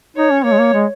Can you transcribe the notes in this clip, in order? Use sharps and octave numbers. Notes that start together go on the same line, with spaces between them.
D#4 C#5
C#4
A#3 C#5
G#3
A#3
G#3